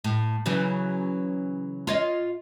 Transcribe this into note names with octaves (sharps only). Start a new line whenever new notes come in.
A2
C#3 E3 F#3
F4 C#5 D#5